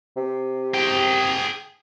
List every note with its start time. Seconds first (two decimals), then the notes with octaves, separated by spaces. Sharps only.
0.16 C3
0.74 G#4 G5